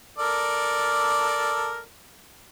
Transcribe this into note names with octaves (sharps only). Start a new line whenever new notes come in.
A4 A#4 D5